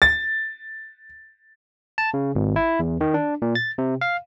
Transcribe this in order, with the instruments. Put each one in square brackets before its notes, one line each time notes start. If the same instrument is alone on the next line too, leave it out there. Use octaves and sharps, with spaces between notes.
[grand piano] A6
[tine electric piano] A5
C#3
G#1
E4
E2
D#3
D4
A#2
A6
C3
F5